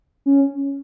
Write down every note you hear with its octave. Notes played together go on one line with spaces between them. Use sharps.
C#4